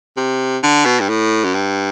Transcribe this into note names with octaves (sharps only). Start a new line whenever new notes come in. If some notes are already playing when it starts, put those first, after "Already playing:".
C3
D3
B2
G2
A2
F#2
G2